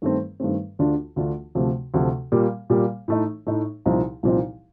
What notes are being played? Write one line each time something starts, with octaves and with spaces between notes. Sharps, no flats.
G2 D#3 A3 C4
G2 D#3 A3 C4
D2 D3 A3 D4 F4
D2 D3 A3 D4 F4
D2 C3 F3 A3
D2 C3 F3 A3
A#2 G3 A#3
A#2 G3 A#3
A2 A3 D#4
A2 A3 D#4
C2 A#2 F3 C4 D#4
C2 A#2 F3 C4 D#4